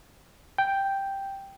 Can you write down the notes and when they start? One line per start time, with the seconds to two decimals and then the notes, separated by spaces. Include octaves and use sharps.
0.58 G5